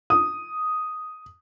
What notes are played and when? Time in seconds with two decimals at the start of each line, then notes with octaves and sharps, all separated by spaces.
0.10 D#6